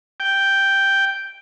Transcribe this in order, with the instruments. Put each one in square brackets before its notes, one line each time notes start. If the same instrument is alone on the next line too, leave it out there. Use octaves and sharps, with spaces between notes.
[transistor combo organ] G5